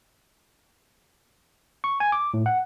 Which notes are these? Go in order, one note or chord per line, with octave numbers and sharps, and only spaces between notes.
C#6
G#5
D6
A2
F#5